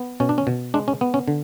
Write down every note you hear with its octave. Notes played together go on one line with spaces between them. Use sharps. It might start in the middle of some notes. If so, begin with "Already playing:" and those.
Already playing: B3
B2 C#4
D4
C#4
B2
G#3 D4
C#4
B3
C#4
D3